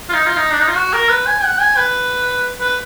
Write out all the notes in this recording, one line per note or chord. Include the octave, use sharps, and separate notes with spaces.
F4
D#4
F4
D#4
D4
D#4
F4
F#4
A#4
B4
G#5
F#5
G#5
B4
B4